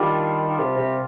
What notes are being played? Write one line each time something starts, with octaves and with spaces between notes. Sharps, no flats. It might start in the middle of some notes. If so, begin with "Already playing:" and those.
Already playing: D#3 G3 D4 F4 A#4
C3
C3